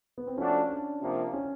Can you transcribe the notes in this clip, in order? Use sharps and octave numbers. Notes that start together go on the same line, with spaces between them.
B3
C4
F3 A3 C#4 D4 F#4
D4
C3 F3 A#3
C#4